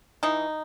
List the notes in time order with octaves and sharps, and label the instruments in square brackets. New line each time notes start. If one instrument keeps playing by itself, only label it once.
[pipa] E3 D#4